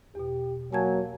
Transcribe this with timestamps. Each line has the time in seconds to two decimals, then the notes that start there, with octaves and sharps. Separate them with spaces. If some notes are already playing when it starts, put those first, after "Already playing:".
0.15 E2 B2 G4
0.73 F#3 A#3 G#5 A5 G#6